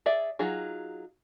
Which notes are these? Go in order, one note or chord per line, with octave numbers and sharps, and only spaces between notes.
G#4 D5 E5
F#3 D#4 F4 G#4